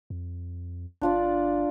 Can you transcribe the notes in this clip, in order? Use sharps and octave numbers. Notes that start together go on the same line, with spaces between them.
F2
G1 D4 F4 D5